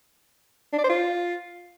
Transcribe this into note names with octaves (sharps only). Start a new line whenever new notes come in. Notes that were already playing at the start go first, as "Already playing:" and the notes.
D4
D5
C5
F4